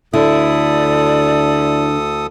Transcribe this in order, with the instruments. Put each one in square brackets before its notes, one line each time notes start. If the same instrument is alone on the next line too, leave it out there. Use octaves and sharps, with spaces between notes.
[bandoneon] D2 A4 D#6 [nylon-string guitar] D3 [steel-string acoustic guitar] E4 [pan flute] D5